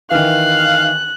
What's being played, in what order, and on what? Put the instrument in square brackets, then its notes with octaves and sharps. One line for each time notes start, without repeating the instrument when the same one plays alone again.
[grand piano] D#3 E3 [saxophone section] F5 [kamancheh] F#6